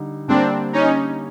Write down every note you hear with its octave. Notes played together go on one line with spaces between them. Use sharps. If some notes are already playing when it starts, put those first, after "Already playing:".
Already playing: D3 G3 D#4
D3 G3 A#3 C4 D4
C#4 D#4